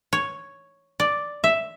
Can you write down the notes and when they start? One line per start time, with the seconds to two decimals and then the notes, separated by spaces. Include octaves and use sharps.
0.13 C#5
1.00 D5
1.44 E5